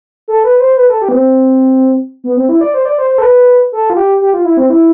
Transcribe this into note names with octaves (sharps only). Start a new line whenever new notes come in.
A4
B4
C5
B4
A4
G4
B3
C4
B3
C4
E4
D5
C5
D5
C5
C5
A4
B4
A4
F4
G4
G4
F4
E4
C4
E4